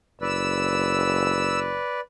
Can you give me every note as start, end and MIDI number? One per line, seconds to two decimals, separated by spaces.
0.21 1.81 30
0.21 2.00 71
0.21 2.00 74
0.21 1.59 88